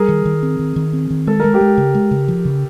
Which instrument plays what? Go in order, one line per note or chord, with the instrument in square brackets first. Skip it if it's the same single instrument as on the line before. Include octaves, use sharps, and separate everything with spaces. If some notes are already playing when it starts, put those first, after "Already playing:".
Already playing: [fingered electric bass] G3 [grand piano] G#4 A#4
[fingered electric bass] D#3
D#3
C4
D#3
D#3
C4
D#3
[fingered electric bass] G#3 [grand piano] A4
[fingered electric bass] G#3 [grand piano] A#4
[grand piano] G4 A4
[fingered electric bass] G#3
C#3
G#3
C#3
F3
C#3